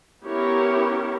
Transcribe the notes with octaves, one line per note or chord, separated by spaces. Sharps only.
B3 C#4 E4 G4 A#4 C#5